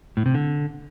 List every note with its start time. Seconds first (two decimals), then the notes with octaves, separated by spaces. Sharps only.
0.17 A2
0.26 C3
0.34 D3